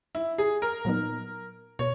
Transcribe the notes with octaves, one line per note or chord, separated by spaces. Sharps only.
E4
G#4
A#4
A#2 F#3 B3 D#4
B2 C#5